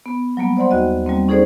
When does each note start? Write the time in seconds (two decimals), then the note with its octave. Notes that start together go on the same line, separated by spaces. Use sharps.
0.06 B3
0.37 F#3 G3 A#3 B3
0.57 C5 D5 F#5 C6
0.71 D#2 F#4 D#5
1.06 G3 A#3 C4
1.28 C#4 D#4 G#4 A4 C5 D5